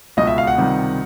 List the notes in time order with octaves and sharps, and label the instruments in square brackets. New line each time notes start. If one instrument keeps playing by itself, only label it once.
[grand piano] C#2 B2 G#3 D#5
E5
F5
F#5
C#2 C3 D#3 G3